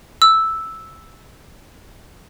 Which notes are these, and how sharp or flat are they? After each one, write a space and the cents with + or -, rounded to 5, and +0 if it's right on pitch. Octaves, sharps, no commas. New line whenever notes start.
E6 -5